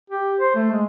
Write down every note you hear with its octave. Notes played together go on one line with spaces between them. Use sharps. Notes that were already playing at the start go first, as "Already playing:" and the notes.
G4
C5
A3
G#3